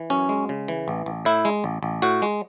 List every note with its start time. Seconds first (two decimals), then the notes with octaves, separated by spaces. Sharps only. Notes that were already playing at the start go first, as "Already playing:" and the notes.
Already playing: E3
0.10 F#2 C#4
0.29 G#3
0.49 C#3
0.68 E3
0.88 A1
1.06 A1
1.25 A2 E4
1.45 G#3
1.64 A1
1.83 A1
2.02 A2 F#4
2.22 G#3